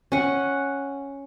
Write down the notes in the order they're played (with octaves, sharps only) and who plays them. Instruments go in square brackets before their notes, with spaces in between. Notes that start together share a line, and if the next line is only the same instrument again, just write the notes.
[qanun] C#4 F#5